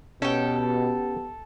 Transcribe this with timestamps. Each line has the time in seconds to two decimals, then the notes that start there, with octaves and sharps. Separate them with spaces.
0.22 B2 B3 C#4 G4 A4 G5